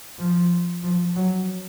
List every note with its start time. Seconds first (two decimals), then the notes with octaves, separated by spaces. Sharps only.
0.19 F3
0.83 F3
1.16 F#3